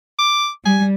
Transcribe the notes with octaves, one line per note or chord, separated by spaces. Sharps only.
D6
G3 G#5